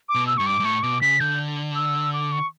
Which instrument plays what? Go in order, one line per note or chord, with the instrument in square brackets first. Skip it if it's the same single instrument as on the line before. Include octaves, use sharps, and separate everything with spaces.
[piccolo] D6
[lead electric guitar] B2
[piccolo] E6
[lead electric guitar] G2 [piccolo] C#6
[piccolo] D6
[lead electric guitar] G2
[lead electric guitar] A2 [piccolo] C#6
[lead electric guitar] B2 [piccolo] D6
[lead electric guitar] C#3 [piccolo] B6
[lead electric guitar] D3 [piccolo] G6
[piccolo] E6
D6
C#6